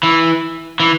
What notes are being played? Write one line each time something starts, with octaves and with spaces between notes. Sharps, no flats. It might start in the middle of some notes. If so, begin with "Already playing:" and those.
E3
E3